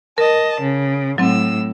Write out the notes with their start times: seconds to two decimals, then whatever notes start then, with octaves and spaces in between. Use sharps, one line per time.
0.18 A#4 D#5 A5
0.60 C#3
1.18 A2 F#3 C4 E6